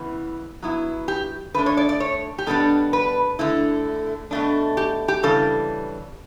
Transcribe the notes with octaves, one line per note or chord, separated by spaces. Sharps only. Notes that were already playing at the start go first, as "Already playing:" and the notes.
Already playing: C#3 E3 B3 E4
F#3 B3 E4
G4
D3 A3 D4 B4
C#5
D5
D5
C#5
G4
B2 G3 B3 D4 A4
B4
D3 A3 E4
B2 A3 D4
G4
G4
C#3 E3 G3 D4 A4